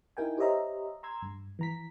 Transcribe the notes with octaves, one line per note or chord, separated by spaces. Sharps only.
D#4 E4 A#4 G5 G#5
G4 C5 C#5 D#5 E5 A#5
A#5 C6 E6 G#6
G2
E3 A#5 B6